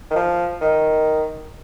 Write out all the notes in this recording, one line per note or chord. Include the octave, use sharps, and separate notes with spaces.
D#3
F3
D#3